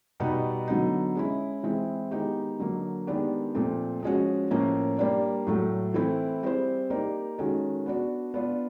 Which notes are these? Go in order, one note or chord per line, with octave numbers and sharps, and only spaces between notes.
B2 G3 B3 D#4
D3 F#3 B3 D#4
G#3 C#4 E4
E3 G#3 C4 E4
D#3 G#3 B3 D#4 G4
D3 F#3 A#3
D#3 G#3 B3 D4 G4
A#2 F3 A3 C4
F3 G#3 C#4 F#4
A2 F3 A#3 C#4
G3 A#3 D4
A2 F#3 A3
E3 A3 C4 E4
G3 C4 E4 G#4 C5
A#3 D#4 G4 A#4 D5
D#3 G#3 C#4 F#4 A4
B3 D4 F#4
B3 D4 F4